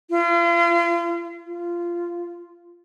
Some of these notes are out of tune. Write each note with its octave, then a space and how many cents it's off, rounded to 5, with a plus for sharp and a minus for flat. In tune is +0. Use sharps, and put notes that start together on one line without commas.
F4 -40
F4 -15